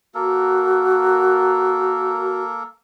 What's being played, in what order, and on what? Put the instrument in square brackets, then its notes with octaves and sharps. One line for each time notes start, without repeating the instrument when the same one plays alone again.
[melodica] A#3 A4 A#4 [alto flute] F#4